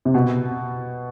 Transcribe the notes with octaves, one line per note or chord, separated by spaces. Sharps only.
C3
B2